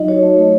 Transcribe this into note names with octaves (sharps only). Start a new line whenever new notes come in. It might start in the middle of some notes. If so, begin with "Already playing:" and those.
Already playing: F#3 D#4 F4 D#5
F#4 C#5
A3
A3